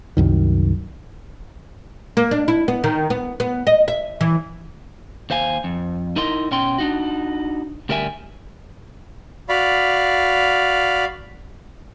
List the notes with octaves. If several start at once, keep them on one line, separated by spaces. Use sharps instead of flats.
C2 F#2 D#3
A#3
D4
E4
B3
D#3
B3
B3
D#5
E5
E3
D#2 C5 F5 G#5
F2
D#4 E4 A#4 D#5 C6
B2 C#4 G5 C6
D4 D#4 F#4
D2 G3 A#4 E5 G#5
F#4 D5 F5 B5